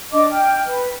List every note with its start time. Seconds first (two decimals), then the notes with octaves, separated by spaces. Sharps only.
0.12 D4 D#5 A5 D6
0.30 G5 F6
0.65 B4